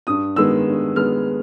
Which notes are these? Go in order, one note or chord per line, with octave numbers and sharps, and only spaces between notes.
G2 D#6
D#3 G#3 B3 E6
G2
D#3 G#3 B3 F6